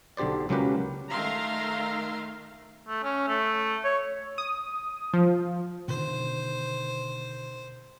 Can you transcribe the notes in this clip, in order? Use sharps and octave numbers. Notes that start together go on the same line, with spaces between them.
B1 D3 G4 C5 D5
C#2 F#3 A#3 C#4 G4 B4
D#3 A3 E5 F5 A#5 C6
A3
C#4
A3
C#5
D#6
F3
B2 D3 D#3 C5